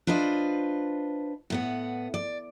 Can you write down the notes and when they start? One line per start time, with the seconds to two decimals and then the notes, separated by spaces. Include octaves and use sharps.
0.07 D4 F4 B4 C5 D#5
1.50 A2 B3 F#5
2.14 D5